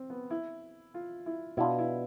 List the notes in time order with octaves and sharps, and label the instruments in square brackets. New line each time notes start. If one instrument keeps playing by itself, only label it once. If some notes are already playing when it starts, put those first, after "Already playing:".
Already playing: [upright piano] C4
B3
E4
F4
E4
[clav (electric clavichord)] B2 B3 D4 F4 [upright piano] E4
[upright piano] E4